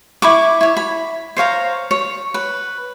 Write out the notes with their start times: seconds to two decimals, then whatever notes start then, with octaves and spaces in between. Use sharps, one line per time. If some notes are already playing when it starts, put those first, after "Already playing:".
0.22 E4 B5 C#6 D6
0.61 E4 C#5
0.77 B5
1.37 C5 C#5 F5 A#5
1.91 C#5
2.34 B4